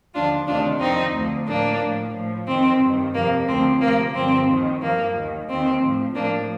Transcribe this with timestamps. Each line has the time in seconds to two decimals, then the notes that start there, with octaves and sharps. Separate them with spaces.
0.14 D#2 D3 F3 D4 F4
0.47 D2 C3 D#3 D4 F4
0.80 F2 D#3 C4 D#4
1.13 D2 D3 F3
1.47 A2 F3 A#3 D4
1.80 A2 F3
2.14 A2 F3
2.47 F2 D#3 C4
2.80 G2 D#3
3.14 F2 C3 F3 A#3
3.48 D2 D3 F3 C4
3.81 D2 C3 F3 A#3
4.15 G2 D3 F3 C4
4.48 D#2 D#3
4.81 G2 F3 A#3
5.15 D#2 D#3
5.48 D#2 D#3 C4
5.81 A2 F3
6.15 A2 F3 A#3 D4